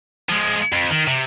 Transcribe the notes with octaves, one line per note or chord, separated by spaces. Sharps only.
F3 G#3
F2
D#3
C3